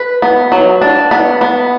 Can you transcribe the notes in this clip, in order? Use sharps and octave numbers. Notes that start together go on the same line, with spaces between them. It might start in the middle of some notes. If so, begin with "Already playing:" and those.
Already playing: B4
B3
F#3
D4
B3
B3